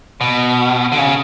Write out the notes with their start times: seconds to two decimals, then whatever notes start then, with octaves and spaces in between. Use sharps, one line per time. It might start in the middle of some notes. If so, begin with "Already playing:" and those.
0.21 B2
0.92 D3
0.99 C#3